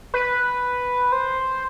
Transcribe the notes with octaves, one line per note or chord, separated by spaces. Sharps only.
B4
C5